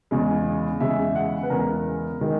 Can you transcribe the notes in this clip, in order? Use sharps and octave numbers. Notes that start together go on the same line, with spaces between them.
E2 C#3 G#3
E2 C#3 G#3 E5
F#5
B4
E2 C#3 G#3 A#4
D#3 G#3